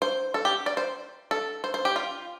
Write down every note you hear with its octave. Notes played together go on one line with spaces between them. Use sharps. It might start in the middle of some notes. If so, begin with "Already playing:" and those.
C5
A4
G4
D5
C5
A4
C5
C5
G4
F4